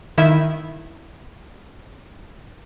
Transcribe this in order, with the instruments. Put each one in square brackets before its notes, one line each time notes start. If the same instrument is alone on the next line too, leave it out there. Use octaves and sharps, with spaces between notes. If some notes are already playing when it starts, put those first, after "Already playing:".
[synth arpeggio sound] D#3 E4 E5